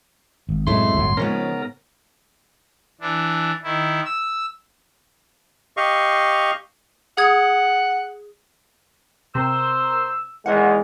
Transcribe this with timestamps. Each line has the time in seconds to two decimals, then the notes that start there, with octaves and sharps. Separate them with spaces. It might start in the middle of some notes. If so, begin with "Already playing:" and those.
0.49 G#1
0.67 F#2 A2 C3 G#3 A3 E4 C6
0.93 D1 G1 F#3
1.17 G#2 C#3 F3 B3 C#4 A#4
3.01 E3 D4
3.64 D#3 E4
4.05 E6
5.77 G4 D#5 F5 C#6
7.17 G#4 F#5 D#6 G#6
9.35 C3 A#4 C5 E6
10.46 E2 D#3 G#3 A#3 F#5